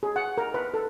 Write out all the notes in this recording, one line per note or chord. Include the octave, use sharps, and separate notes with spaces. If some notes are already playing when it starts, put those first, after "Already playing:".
G#4
F#5
A#4
B4
A4